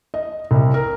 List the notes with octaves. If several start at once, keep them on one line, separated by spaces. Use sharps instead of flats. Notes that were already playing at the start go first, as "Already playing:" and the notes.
D#5
C2
A#4